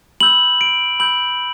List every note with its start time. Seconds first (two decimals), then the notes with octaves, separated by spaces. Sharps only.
0.20 B5 E6 G6 F#7
0.61 D7
1.00 B5 E6 G6 F#7